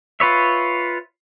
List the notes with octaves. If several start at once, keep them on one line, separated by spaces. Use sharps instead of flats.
F4 B4 C#5 E5